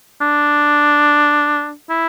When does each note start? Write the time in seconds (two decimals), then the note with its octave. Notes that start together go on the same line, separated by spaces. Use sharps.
0.21 D4
1.89 E4